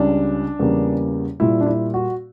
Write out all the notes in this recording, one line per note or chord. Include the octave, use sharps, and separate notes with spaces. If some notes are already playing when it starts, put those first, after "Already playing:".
Already playing: C#2 C#3 G3 D4
E2 C#3 G3 A#3
A#2 G3 A#3 E4
D4
E4
F#4